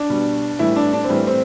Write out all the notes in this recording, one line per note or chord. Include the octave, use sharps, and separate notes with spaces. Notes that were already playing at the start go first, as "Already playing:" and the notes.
Already playing: D4
B2 G3
A2 E3 G3 E4
D4
D4
C4
A2 E3 G3
C4